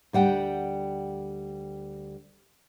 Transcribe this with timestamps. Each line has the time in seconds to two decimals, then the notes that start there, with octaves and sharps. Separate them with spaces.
0.13 D2 G3 F#5 G5